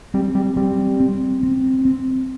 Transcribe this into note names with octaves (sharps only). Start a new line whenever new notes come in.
G3 C4
G3
G3 C4
C4
C4
C4